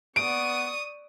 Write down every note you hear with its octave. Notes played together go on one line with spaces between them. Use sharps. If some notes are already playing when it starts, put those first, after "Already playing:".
B3 D5 C#6 D#6 D7